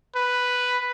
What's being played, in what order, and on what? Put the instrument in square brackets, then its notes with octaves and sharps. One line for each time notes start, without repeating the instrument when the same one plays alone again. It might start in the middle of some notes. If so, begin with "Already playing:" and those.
[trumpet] B4